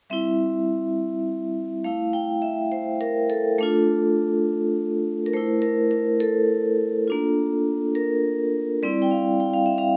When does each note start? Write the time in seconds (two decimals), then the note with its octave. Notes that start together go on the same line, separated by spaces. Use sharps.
0.10 G3 C4 E4 E5
1.84 A3 E4 F5
2.13 G5
2.42 E5
2.72 C5
3.01 A#4
3.30 A4
3.58 A3 D4 F4 A4
5.26 A#4
5.33 A3 E4 C5
5.62 A#4
5.91 A#4
6.20 A4
7.08 A#3 D4 F4
7.95 A#4
8.83 G3 C4 E4 D5
9.02 G5
9.11 F5
9.40 G5
9.53 F5
9.66 E5
9.78 F5